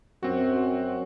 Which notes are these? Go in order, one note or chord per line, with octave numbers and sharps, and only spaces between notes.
F#2 C4 F#4